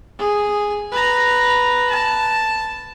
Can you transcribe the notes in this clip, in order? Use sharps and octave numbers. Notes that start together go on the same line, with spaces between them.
G#4
B4 A#5
A5